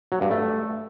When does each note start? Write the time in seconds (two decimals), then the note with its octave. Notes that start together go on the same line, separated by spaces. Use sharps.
0.12 F#3
0.21 G2
0.31 A3